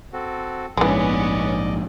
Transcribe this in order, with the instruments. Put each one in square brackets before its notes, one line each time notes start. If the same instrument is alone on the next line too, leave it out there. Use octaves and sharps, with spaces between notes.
[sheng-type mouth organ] C4 F#4 A4
[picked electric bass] A#1 G#2 [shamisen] E3 G#3 [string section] B3 C#4 [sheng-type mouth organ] D5 D#5